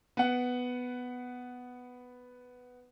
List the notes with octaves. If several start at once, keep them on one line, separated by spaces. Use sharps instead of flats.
B3 F#5